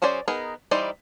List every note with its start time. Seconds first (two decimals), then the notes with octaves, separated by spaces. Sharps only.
0.02 F#3 C#4 G#4 C5 D5
0.28 B3 D#4 G#4 A#4
0.71 E3 G3 D#4 C5 D5